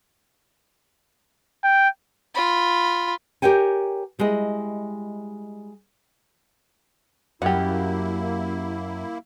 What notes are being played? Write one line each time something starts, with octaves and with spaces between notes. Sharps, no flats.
G5
F4 B5
G4 A#4 C#5 G5 G#5
G3 G#3 E4 D#5
F#2 A#3 E4 G4 F#5